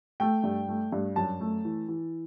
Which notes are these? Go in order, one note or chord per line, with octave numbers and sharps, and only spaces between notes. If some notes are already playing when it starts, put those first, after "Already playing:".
A3 G5
G2
A3
G2
F#2 A5
A3
E3
E3